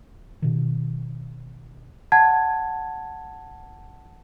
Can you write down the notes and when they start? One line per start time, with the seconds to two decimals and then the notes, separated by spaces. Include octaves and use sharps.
0.42 B2 D#3
2.12 F#5 A5 G#6